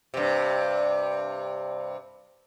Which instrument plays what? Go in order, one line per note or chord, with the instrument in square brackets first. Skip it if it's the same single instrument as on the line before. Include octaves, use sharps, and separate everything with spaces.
[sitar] G2 C3